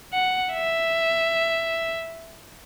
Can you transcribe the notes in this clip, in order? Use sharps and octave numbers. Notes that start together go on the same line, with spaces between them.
F#5
E5